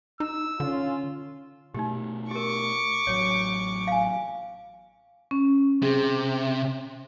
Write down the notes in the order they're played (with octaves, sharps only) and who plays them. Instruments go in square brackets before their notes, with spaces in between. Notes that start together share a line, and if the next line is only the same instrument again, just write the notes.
[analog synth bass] D#4 [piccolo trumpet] E6
[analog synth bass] D3 [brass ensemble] C#4 F4
[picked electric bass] B2 A3 [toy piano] D#4 G4
[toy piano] G4 A#4 [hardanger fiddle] C#6 D6
[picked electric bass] A1 F#3 [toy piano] C#5
[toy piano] F5 G#5
[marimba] C#4
[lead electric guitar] C3 [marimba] G#4